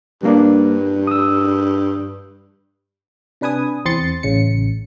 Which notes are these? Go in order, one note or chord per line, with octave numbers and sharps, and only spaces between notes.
G2 G3 A#3 D4
D#6 E6
C3 D4 B4 G#5 D#6
E2 C4 C6 A6 C#7
A1 C#3 C#7